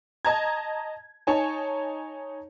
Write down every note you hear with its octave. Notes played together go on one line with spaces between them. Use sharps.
D#5 A5 A#5 G#6
D#4 C#5 G#5 A5